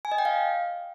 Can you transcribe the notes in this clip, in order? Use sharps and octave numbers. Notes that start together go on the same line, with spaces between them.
G#5
D#5
G5
F5